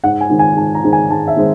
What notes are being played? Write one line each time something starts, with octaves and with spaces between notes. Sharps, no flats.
G#2 F#5
G#5
D#3 G#3 C4
G#5
G#2 A5
A#5
D#3 G#3 C4
G#5
G#2 A5
E5
D#3 G#3 C4